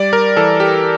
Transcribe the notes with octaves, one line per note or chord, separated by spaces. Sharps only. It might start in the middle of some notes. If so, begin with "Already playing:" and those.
Already playing: G3 D5
A#4
E3 A4
G4